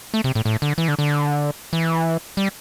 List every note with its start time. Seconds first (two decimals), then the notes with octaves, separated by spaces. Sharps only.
0.14 A3
0.24 C3
0.35 A2
0.45 A2
0.62 D3
0.78 E3
0.88 D3
0.99 D3
1.73 E3
2.37 G3